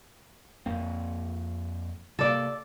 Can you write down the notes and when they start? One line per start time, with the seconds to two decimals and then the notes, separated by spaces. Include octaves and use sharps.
0.66 F2 A#3 C4
2.19 C3 A#3 A4 D5